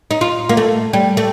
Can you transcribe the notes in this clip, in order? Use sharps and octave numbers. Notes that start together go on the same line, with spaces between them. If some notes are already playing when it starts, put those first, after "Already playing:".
D#4
F4
A#3
A3
G3
A3